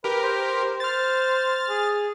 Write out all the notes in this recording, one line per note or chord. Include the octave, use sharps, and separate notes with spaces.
G4 A#4 B4
C5
C5 F6 A6
G#4